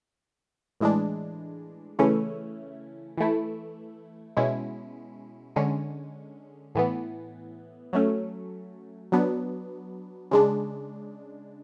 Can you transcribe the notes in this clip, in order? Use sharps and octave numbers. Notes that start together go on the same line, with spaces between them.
A2 E3 G#3 D4
C#3 E3 A3 C#4 E4
E3 A3 E4
B2 G#3 C#4 E4
D3 G#3 C#4
A2 E3 B3
F#3 A3 C#4
F#3 B3 D4
C#3 G#3 D4